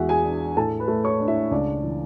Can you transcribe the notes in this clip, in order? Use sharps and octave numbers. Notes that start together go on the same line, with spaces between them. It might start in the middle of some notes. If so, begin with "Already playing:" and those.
Already playing: E2 G#3 F#4 E5 F#5
G#4 G#5
D4
A2 A4 A5
B4 B5
A3
C#5 C#6
D4
E4 E5
C#2 D4 D5
E3